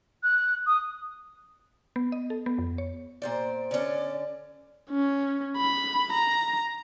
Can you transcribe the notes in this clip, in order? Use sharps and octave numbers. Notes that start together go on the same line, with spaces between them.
F#6
D#6
B3
D#5
A4
B3
F2
C#5
A#2 C5 D5
D3 C#4 D5
C#4
B5
A#5